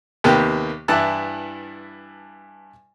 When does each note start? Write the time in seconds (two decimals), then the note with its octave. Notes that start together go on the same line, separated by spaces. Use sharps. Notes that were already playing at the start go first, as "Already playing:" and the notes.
0.24 D#2 C3 A#3 B3 G4
0.88 G2 E3 E4 A5 F#6